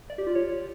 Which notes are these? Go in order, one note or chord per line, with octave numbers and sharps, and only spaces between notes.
D5
G4
F4
C#5